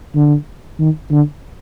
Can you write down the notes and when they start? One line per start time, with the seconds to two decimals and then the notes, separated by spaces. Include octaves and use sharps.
0.15 D3
0.80 D#3
1.11 D3